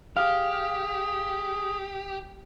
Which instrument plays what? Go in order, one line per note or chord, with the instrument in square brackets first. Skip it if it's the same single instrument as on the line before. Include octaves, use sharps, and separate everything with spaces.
[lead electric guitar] G4 [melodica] G#4 [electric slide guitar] F5